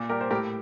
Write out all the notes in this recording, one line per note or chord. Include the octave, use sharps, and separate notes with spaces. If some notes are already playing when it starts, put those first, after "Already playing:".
Already playing: A#2
G3 G4 A#4
C5
A2 G4 A#4